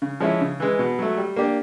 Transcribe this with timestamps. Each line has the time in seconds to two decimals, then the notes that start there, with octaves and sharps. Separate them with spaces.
0.02 C#3
0.20 F3 G#3 C#4 E4
0.41 C#3
0.60 E3 G#3
0.79 B2
0.99 F#3 A3
1.17 G3
1.36 A#3 D4 G4